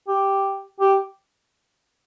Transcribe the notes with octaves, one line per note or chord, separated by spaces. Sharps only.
G4
G4